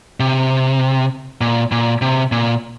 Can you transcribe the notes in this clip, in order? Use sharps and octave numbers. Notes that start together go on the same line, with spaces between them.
C3
A#2
A#2
C3
A#2